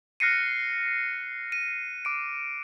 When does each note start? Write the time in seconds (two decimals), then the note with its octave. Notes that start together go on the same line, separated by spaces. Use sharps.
0.20 F6 F#6 A#6 C7 C#7 D#7
1.52 D#7
2.05 D6 D7